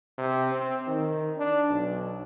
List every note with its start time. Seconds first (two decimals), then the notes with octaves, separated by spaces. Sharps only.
0.18 C3
0.52 C4
0.87 D#3
1.38 D4
1.70 B1